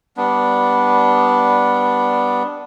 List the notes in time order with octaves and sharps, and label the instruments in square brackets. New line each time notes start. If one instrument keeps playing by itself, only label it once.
[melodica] G3 B3 D4